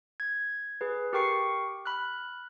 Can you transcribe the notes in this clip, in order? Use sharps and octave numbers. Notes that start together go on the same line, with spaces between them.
G#6
G#4 B4
G4 A#4 G5 C#6 C7 C#7
B5 F6 F#6